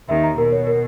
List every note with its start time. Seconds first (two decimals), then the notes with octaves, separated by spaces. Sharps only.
0.09 D#2 D#3 E5
0.24 A#5
0.38 B2 A#4
0.52 C#5
0.67 A#4